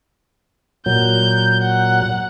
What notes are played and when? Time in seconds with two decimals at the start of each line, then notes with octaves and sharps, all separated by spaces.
0.86 A#2 F#3 G6
1.62 F#5